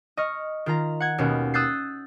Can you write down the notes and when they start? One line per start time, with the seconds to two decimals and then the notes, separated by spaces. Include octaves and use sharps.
0.17 D#5 C#6 F6
0.66 D#3 F4 A#5
1.00 F#5 G#6
1.18 D#2 B2 B3 C#4
1.54 D#6 E6 F#6 G6 A6 C7